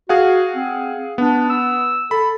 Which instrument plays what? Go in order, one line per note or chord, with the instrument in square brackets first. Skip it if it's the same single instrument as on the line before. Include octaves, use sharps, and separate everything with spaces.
[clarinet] F#4 [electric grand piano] G#4 F5 F#5
[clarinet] C4
[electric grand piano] B3 [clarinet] D4
[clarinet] E6
[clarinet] A4 [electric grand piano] B5